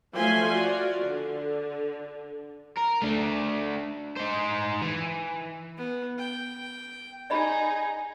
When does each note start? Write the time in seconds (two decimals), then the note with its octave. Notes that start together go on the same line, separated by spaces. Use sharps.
0.14 F3 F#3 A3 E5 G#5 C6
0.51 F4 F#4 D5
1.00 D3
2.77 A#4
3.02 A3 D4
4.16 D#4 C5
4.82 E3
5.77 B3
6.18 G5
7.30 D#4 G#4 D5 D#5 B5